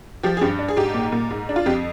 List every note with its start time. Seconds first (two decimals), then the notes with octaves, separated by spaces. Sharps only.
0.23 F3 G4
0.37 G#4
0.41 G2 G4
0.59 D4
0.68 G#4
0.76 G#2 G4
0.94 A#2
1.12 A#2
1.31 G#2
1.49 D4
1.56 F4
1.66 F2 G4